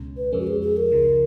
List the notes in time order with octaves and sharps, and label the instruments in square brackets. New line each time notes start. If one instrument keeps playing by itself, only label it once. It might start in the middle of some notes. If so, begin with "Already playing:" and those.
Already playing: [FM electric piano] C#2 B2 G#3 C#4
[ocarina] B4
[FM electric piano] F2 F3 G#3 C#4 [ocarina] A#4
[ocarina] F#4
G#4
G#4
A#4
[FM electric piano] C#2 C#3 F3